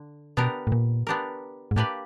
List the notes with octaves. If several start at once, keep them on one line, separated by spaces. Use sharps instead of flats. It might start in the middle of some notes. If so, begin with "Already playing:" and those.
Already playing: D3
B2 B3 D4 G4 A#4
A2
A#2
B3 D4 G4 A#4
G#2
A2 A#3 D4 G4 B4 D5